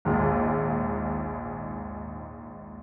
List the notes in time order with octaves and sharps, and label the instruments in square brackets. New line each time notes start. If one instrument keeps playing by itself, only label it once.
[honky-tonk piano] A#1 D#2 G#2